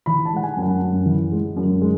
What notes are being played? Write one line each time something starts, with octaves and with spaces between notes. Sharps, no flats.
E3 B5
A5
G#3 F#5
G#5
F#2
F#5
F#2
E3
G#3
F#2
G#3